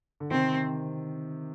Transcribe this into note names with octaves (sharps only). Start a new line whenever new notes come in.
D3
C3 D#3 C4